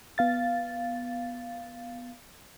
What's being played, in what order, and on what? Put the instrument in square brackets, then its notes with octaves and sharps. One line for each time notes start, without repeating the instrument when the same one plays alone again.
[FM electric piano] B3 F5 A6